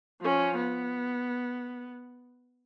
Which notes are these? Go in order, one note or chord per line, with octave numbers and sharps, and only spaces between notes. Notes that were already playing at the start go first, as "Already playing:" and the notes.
F3 C#4
B3